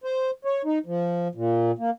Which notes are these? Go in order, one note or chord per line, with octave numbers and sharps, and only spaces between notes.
C5
C#5
D#4
F3
A#2
A#3